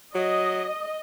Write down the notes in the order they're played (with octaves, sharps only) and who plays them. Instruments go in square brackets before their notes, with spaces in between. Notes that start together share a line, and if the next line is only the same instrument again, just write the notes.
[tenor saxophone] F#3 [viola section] D#5